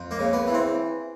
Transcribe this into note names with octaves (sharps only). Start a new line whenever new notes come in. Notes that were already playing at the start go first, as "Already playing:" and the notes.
Already playing: F2
A#3
C#3
B3
E3
C4